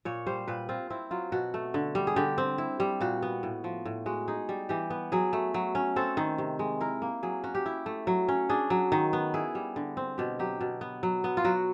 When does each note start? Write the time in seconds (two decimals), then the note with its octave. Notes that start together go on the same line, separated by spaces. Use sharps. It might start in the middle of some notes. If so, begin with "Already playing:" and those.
0.05 A#2 C#5
0.27 G3 C5
0.48 A#2 B4
0.69 C4 F4
0.90 C4 E4
1.11 F#3 F4
1.32 B2 F#4
1.54 A3
1.74 D3
1.95 G3
2.07 G#4
2.16 D3 G4
2.38 C4
2.58 E4
2.80 G3
3.01 A#2 F#4
3.23 B3
3.43 A2
3.64 F3
3.86 A2
4.06 G#3 F#4
4.28 D#4 G#4
4.49 G3
4.69 E3 G4
4.90 B3
5.12 F#3 G#4
5.33 A3
5.54 F#3
5.75 C#4
5.96 C4 A4
6.17 D#3
6.38 C3
6.59 G#3
6.81 E4 A#4
7.02 A#3
7.23 F#3 G#4
7.44 C#4 F#4
7.55 G4
7.66 E4
7.86 A3
8.07 F#3
8.29 C#4
8.49 D4 G#4
8.70 F#3
8.92 D#3
9.13 B3
9.34 E4 G#4
9.55 G3
9.76 D3
9.97 C4
10.18 B2 G4
10.39 F#3 G4
10.61 B2
10.81 B3
11.03 F#3
11.24 B3
11.37 F4
11.45 F#3 F#4